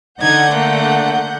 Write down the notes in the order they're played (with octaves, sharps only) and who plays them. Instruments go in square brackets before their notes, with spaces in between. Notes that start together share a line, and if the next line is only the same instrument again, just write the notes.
[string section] D3 F#5 G6 [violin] D#4 G#6
[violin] A3 A#3